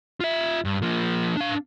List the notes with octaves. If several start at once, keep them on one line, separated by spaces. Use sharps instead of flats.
F4 E5
G2
F3 A#3
D4 F5